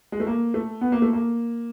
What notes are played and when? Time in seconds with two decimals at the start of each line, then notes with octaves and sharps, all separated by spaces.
0.12 G#3
0.20 A3
0.27 A#3
0.54 A3
0.81 B3
0.92 A#3
1.02 A3
1.13 A#3